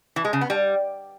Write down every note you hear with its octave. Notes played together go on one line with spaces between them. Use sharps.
E3
G#3
C#3
B3
G3